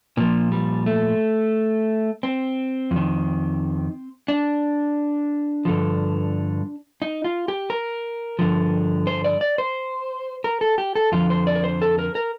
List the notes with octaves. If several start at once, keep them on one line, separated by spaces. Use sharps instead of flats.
A#2 F3 A#3
G3
A3
C4
F2
D#3
D4
G2 D3 F3
D#4
F4
G4
A#4
G2 D3 F3
C5
D5
D5
C5
A#4
A4
G4
A4
F2 D3 F3 F4
C5
D5
A#4
C5
A4
A#4
A#4